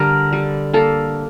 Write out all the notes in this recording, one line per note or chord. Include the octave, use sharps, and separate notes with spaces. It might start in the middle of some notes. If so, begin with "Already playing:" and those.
Already playing: D3 G3 A#4
G3
A#3 A4